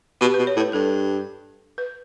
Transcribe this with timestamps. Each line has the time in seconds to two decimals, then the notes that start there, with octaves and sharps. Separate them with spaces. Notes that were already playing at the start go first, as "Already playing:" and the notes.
0.21 B2 G4
0.34 B2 B4
0.47 C#5
0.57 A2
0.60 B4
0.73 G2 A4
1.78 B4